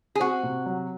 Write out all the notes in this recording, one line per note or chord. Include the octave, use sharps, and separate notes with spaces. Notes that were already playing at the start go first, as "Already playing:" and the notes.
G#4
C4 F#4
C3
F#3